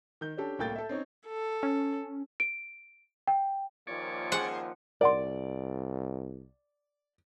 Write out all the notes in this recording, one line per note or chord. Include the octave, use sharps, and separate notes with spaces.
D#3 G6
C#4 D4 G4 A4
C2 A2 A#3 G5 G6 A6
A4 E5
C4 C#4 D#4 C#5
A4
C#4
D7
G5
D#2 A#2 F3 C#5 D5
G#4 C5 F#5
C2 A#4 D5 F#5 C6